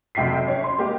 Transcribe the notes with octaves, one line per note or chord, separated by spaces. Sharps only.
F#1 F2 C3 G5 B6 C7
C#4
C6
G#3 A#3 G4